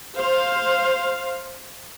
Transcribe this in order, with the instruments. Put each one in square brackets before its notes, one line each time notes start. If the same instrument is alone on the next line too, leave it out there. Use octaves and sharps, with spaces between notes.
[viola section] C5 F5